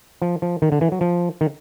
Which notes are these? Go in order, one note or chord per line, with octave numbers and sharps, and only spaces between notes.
F3
F3
D#3
D3
E3
F#3
F3
D#3